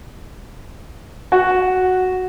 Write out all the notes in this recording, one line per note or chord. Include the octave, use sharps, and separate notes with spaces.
F#4